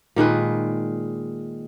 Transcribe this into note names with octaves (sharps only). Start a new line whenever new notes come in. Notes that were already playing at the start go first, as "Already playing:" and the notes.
A#2 D#3 G#3 B4